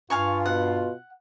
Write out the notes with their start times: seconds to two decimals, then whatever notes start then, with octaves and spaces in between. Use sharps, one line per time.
0.10 G2 F4 F5 G#5 C#6
0.46 B2 F#5